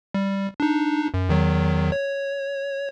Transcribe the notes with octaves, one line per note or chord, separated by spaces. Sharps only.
G3
D4 D#4
F#2
E2 D#3 F#3
C#5